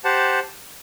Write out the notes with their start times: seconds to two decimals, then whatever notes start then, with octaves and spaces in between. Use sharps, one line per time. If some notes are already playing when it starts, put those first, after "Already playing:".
0.04 G4 C5 F#5 A5